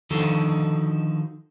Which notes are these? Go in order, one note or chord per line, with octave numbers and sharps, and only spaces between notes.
D3 D#3 F3 D#4 F#4 A4